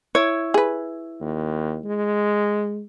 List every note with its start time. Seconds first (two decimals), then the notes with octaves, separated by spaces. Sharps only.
0.15 E4 C#5
0.54 G#4 B4
1.21 D#2
1.85 G#3